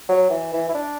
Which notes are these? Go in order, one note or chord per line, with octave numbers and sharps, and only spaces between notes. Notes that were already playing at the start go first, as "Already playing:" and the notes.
F#3
E3
E3
E4
D4